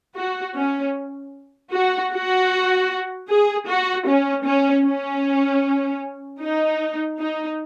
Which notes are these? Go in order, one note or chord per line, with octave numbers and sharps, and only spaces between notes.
F#4
C#4
F#4
F#4
G#4
F#4
C#4
C#4
C#4
D#4
D#4